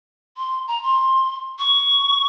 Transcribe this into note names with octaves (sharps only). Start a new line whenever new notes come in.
C6
A#5
C6
C#6